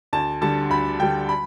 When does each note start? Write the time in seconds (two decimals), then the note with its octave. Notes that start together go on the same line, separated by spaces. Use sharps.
0.13 D2 A5
0.41 D3 G3 A5
0.70 D2 B5
0.99 D3 G3 G5
1.29 B5